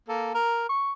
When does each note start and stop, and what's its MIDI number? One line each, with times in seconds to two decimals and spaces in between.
0.08 0.34 58
0.08 0.34 69
0.34 0.66 70
0.69 0.92 85